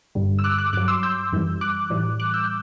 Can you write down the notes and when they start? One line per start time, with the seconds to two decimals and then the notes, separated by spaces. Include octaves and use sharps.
0.15 G2 D3 G3
0.39 E6
0.44 D6 F#6
0.58 D6 F#6
0.73 G2 F#3 D6 F#6
0.88 C6 E6
1.03 E6 G6
1.32 F#2 E3 G3
1.61 D6 F#6
1.90 A2 E3 G3
2.20 D6 F#6
2.34 E6 G6